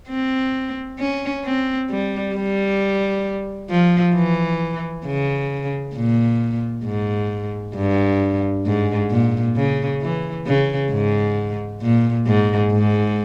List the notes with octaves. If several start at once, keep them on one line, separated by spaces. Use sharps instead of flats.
C4
C#4
C4
G3
G3
F3
E3
C#3
A#2
G#2
G2
G#2
A#2
C#3
E3
C#3
G#2
A#2
G#2
G#2